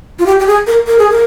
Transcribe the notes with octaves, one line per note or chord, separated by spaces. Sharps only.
F4
G4
G4
G#4
A#4
A#4
G#4
A#4